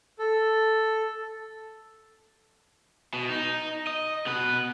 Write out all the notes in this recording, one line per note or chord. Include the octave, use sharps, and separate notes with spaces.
A4
B2
D#4
D#5
B2 B4